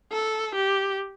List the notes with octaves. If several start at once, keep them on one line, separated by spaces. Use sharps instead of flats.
A4
G4